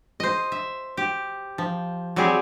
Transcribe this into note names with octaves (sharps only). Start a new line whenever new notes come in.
C5 D#5
E5
G4
F3
F#3 G3 C4 G4 G#4